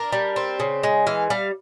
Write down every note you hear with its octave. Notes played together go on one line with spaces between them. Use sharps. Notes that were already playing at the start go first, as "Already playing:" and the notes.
Already playing: D4 A#4
G3
C4
C#3
G#3
E3 F5
G3 F5